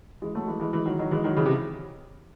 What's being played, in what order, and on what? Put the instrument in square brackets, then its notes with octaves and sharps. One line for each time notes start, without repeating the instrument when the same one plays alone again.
[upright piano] E3 G#3
F#3 A3
E3 G#3
E3 G#3
E3 G#3
D#3 F#3
D#3 F#3
E3 G#3
D#3 F#3
C#3 E3
C3